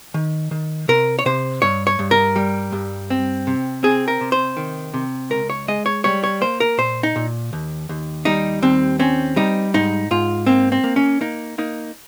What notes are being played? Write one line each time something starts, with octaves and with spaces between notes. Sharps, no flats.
D#3
D#3
C3 A#4
C#5
C3 C5
G2 C#5
C#5
G2
A#4
G3
G2
C4
C3
C4 G#4
A#4
C3
C5
D#3
C3
C#2 A#4
C#5
G#3 D#5
C#5
G3 C#5
C#5
A#3 C5
A#4
A#2 C5
D#4
A#2
D#2
D#2
G3 D#4
D#2 C4
C4 C#4
G3 D#4
G#2 D#4
G#2 F4
A#3 C4
C4
A#3
C#4
A#3 D#4
A#3 D#4